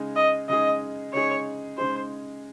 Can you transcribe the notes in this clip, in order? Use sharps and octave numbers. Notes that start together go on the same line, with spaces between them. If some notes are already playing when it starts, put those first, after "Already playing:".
Already playing: C#3 G#3 D#4 G#4
D#5
C#3 G#3 D#4 G#4 D#5
C#3 G#3 D#4 G#4 C#5
C#3 G#3 D#4 G#4 C5